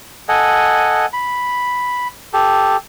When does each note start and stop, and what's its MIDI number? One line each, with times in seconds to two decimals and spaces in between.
0.29 1.06 69
0.29 1.06 75
0.29 1.06 78
0.29 1.06 80
1.13 2.08 83
2.33 2.77 67
2.33 2.77 69